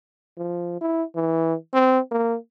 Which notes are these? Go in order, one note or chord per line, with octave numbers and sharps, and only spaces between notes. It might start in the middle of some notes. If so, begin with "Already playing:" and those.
F3
E4
E3
C4
A#3